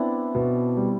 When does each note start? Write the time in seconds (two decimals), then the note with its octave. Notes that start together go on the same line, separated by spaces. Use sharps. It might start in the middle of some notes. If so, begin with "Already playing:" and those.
Already playing: B3 C4 D4 E4
0.35 B2
0.77 G3